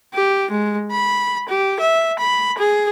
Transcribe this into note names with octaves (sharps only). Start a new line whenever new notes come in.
G4
G#3
B5
G4
E5
B5
G#4